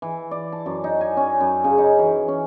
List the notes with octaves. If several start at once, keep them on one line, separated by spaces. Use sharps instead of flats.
E3
D5
A5
F#2
D#4
G#5
C#4
F#2
C#3
D#4
E3
C#4